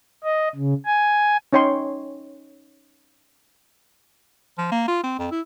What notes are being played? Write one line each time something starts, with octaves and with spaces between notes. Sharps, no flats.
D#5
C#3
G#5
C#4 D#4 C#5 G5 C6
F3
A#3
F4
C4
F2
E4